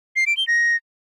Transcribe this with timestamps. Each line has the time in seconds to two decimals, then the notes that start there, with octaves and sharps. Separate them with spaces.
0.16 C7
0.27 D7
0.37 G7
0.48 A#6